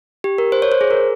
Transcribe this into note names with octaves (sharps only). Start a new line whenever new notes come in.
G4
A#4
C5
C#5
C5
G#4
A#4